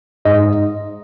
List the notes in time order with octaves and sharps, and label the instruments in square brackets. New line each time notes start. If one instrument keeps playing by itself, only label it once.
[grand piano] G#2 [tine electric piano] D#5